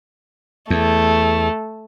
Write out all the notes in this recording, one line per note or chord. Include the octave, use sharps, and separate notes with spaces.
E2 A3